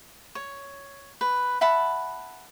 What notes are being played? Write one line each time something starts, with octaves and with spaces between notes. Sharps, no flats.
C#5
B4
E5 F#5 A5 B5